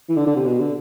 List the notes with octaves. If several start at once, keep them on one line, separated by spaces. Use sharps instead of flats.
E3
D3
D3
C3
B2
D3